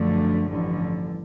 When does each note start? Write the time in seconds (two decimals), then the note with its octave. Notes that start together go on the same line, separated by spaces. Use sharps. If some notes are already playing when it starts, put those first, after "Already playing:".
Already playing: F#2 D3 F3 A3
0.46 A1 G2 D3 F3